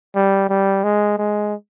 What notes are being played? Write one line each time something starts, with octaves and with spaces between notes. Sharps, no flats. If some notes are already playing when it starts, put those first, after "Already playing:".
G3
G3
G#3
G#3